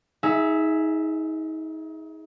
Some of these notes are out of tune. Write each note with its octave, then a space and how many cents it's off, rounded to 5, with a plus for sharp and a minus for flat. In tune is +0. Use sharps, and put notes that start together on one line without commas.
D#4 +35 G#4 +5 E5 +0